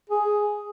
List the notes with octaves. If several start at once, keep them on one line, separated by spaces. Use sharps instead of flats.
G#4